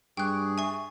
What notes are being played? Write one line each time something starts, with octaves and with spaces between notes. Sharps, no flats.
G2 G#4 G5 C#6 D6 F#6
E5 G#5 C#6 A6